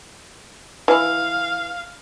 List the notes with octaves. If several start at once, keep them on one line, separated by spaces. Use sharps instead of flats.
E3 E4 F5